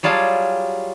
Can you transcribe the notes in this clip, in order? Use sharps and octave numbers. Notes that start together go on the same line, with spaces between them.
F#3 G3 F4 G#4 A5